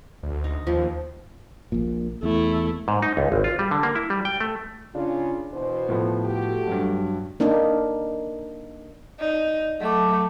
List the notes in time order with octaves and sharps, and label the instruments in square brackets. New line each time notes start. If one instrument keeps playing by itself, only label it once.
[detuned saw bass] D2
[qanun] D#4
[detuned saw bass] D#2 [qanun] F3
[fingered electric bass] A#1 A#2
[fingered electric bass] E2 [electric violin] A3 E4
[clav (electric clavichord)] G#2
D#4
C#2
G#1
F4
G3
D3
A#3
E4
G3
G5
A3
[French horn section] C#3 F4 [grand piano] D4
[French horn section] B2 E3 C5
[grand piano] A2 F3 B3
[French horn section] A3 F#4 G4
[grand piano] G2 F#3
[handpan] A#3 D4 D#4
[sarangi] D#4 [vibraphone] D5
[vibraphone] F#3 D6 [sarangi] A3